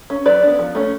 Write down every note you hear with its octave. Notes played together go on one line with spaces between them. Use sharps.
C#4
F#3 B4 D5
B3 D4
F3
A3 C#4